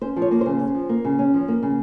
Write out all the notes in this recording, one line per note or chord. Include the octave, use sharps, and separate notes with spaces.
C#4 C5
F3
C#5
A#3
C#3 C5
C#4
F3
A#3
C#3
C#4
F3
A#3
C#3